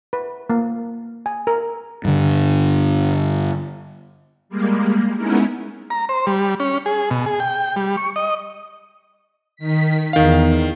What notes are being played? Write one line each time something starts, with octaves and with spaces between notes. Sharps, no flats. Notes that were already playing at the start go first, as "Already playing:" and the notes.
B4
A#3
G#5
A#4
G2 D3
G3 G#3 A#3
G#3 B3 C#4 D#4 E4 A#4
A#5
C5
G3
C#4
G#4
B2
G#4
G5
G3
C#6
D#5
D#3 B6
E2 D#3 F5